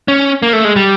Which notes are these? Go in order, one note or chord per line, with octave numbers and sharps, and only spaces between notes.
C#4
A#3
A3
G#3
G3